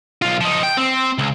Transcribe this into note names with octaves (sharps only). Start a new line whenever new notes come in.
B1 F4
F3 D#4
G5
C4
C#2